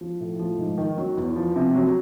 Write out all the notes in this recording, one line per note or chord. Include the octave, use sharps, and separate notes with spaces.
F3
A2
F3
G#2
D#3
F#3
E2
F3
C3
F#3